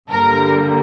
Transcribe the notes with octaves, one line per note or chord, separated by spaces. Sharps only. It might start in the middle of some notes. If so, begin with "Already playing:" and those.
G2 D3 G3 A#3 A#4